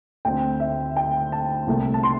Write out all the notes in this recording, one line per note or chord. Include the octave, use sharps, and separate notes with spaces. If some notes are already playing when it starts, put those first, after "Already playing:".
D2 D3 C4 G5
E5
G5
A5
C2 C3 A3
A5
C6